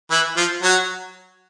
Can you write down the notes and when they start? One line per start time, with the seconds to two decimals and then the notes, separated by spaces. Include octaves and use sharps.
0.11 E3 E4
0.37 F3 F4
0.63 F#3 F#4